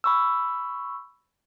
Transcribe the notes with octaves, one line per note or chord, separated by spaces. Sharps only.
B5 C#6 E6